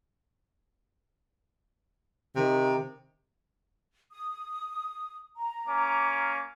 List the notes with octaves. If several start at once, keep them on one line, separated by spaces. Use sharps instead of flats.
C3 D#3
D#6
A#5
A#3 C#4 D6